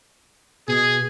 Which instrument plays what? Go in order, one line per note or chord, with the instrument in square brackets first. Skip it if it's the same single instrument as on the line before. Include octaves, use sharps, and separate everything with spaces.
[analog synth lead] B2 [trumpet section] G#4